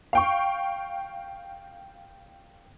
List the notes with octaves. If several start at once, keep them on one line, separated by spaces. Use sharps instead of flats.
F5 G5 C#6